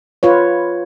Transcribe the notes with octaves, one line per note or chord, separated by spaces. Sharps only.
F4 B4 C#5